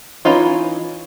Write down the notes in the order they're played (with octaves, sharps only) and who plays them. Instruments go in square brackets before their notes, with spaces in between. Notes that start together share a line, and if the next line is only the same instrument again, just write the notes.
[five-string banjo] E3 C#4 D#4 F4